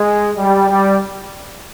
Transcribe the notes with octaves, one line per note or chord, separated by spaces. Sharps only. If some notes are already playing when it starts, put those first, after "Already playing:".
Already playing: G#3
G3
G3